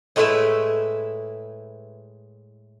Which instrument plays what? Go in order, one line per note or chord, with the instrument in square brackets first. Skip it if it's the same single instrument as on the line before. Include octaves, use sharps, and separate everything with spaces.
[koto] A2 G#3 A3 E4 B4 E5